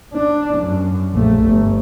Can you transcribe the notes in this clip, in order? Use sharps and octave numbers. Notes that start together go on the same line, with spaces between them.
D4
F#2
A#1 A3
G1